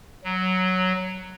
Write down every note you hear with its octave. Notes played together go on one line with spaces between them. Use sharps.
F#3